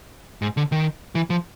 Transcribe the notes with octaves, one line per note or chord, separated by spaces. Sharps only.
G#2
D3
D#3
E3
F3